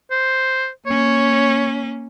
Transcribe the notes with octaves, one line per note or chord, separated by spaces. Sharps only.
C5
A#3 C#4 C#5